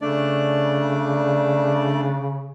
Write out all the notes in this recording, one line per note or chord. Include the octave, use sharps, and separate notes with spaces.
C#3 A3 D4 D5